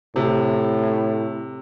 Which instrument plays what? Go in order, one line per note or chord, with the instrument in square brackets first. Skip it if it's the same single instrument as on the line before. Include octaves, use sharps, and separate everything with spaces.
[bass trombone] A2 [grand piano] C3